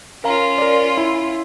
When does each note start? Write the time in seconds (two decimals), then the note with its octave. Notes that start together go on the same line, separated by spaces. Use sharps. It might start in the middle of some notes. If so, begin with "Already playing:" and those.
0.24 C#4 F4 A#4 F5 A#5
0.58 A#4 D5
0.97 E4